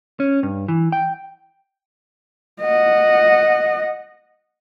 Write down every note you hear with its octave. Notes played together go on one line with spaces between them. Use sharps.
C#4
G2
E3
G5
D#5 F#5